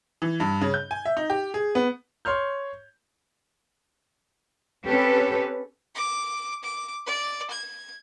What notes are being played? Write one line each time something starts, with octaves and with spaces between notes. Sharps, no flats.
E3
G2
C#3
G6
G#5
E5
D#4
G4
G#4
B3
C#5 C6 F6 G6
C4 C#4 G4 A4 B4
D6
D6
D5
G#6